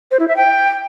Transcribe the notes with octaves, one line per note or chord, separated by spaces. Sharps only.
C5
E4
E5
G5